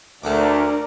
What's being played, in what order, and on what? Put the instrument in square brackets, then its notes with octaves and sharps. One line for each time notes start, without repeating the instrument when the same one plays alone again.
[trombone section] D2 [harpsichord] A3 F#5 D6 [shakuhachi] D4 [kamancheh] A#4 D5